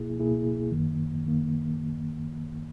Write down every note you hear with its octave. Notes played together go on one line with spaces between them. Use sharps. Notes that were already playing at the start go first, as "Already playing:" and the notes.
Already playing: C#2 B2 A#3 E4 G#4
C#2 B2 A#3 E4 G#4
F#2 D#3 A#3
F#2 D#3 A#3